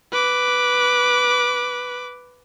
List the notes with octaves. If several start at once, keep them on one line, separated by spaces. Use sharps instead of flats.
B4 D6